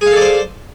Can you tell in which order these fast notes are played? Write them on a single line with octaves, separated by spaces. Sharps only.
G#4 F5 A4 D5 C5